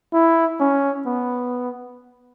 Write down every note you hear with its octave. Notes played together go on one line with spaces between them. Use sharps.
E4
C#4
B3